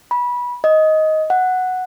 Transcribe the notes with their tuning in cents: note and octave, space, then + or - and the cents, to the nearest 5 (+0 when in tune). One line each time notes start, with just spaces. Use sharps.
B5 -20
D#5 +10
F#5 +0